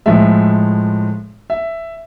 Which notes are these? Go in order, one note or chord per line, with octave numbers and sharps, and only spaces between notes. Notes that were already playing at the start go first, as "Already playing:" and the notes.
A2 F3 G#3 E5
E5